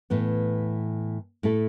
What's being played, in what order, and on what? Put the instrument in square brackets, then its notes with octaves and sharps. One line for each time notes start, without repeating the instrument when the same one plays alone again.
[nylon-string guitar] A2 E3 B3
A2 A3 E4 A4